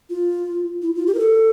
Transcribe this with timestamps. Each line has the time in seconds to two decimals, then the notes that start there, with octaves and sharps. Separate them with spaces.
0.10 F4
0.82 E4
0.95 F4
1.07 G4
1.14 A#4
1.19 A4